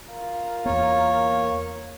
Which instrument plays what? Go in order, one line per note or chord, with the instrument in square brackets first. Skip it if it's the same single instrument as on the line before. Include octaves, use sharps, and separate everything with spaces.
[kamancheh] F4 A#4
[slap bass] E2 B3 [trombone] A#3 [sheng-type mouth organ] C#5